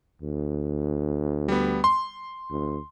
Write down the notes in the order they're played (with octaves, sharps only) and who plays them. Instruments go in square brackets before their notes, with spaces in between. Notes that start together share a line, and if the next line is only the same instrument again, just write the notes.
[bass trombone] D2
[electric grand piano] G3 B3
C6
[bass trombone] D2